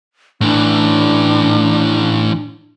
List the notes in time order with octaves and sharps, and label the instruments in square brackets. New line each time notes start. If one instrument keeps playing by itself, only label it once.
[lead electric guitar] A2 E3 [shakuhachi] D4